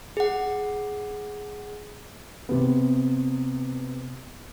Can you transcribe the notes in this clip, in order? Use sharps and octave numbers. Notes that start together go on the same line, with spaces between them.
G#4 F#5
C3 B3